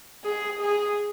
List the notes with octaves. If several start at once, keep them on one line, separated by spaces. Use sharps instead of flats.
G#4
G#4